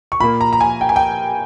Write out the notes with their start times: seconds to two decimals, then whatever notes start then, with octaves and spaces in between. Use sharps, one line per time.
0.12 C#6
0.20 A#2 A#3 B5
0.41 A#5
0.53 A#5
0.61 G#5
0.81 G5
0.89 G#5
0.96 G5